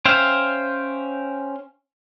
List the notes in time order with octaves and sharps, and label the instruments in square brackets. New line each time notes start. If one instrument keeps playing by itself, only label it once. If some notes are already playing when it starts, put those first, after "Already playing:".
[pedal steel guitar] C#4 C5 E5 F5 G5